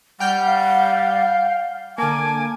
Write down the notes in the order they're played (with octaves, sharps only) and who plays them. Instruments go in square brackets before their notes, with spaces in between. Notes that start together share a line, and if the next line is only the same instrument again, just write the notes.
[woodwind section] G3 [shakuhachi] F#5 [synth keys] G5 F6 G6
[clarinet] F5
[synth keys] D3 A#3 [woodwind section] G#5 [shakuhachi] A5 [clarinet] D6